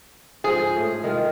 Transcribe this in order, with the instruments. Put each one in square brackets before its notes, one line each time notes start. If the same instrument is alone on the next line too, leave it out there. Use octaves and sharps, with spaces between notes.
[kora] G#2 F3 C5 [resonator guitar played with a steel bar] G#4
[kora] A2
D#3 G#3 F4